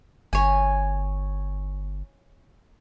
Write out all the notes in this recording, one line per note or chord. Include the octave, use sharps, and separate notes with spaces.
G1 C#5 G#5